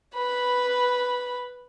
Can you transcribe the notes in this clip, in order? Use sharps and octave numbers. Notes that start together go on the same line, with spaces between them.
B4 B5